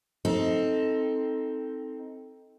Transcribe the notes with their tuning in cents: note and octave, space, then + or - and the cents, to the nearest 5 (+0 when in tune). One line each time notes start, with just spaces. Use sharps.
C4 +0 D#4 +15 A4 +0